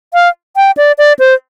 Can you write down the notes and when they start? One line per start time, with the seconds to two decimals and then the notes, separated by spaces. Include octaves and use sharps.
0.14 F5
0.56 G5
0.77 D5
0.98 D5
1.19 C5